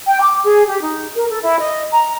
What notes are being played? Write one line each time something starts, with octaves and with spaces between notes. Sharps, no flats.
G5
D6
G#4
G4
D#4
A#4
A4
E4
D#5
A#5